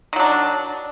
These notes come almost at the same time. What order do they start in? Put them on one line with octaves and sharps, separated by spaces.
D#3 F#3 D4